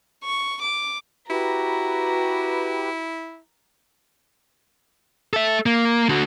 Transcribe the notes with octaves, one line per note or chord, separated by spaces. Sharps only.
C#6
D6
E4 F#4 G4 B4 A#5
A4 E5
A#3
D3 F#4